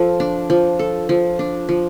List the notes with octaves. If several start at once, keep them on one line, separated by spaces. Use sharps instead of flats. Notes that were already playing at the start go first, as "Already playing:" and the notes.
Already playing: F3 A4
D4
F3
A4
F3
D4
F3